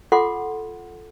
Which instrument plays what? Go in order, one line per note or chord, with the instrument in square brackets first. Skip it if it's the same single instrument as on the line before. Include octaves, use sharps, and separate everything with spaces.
[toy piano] F4 A4 F#5 C6 D6